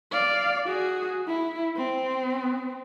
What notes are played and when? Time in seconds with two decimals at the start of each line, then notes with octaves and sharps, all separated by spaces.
0.12 D5 F5
0.66 F#4 G#4
1.27 E4
1.76 C4